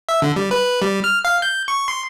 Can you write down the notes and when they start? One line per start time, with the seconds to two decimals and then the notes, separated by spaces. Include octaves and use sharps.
0.09 E5
0.22 D3
0.36 G3
0.51 B4
0.82 G3
1.04 F6
1.25 F5
1.42 G6
1.68 C#6
1.88 C6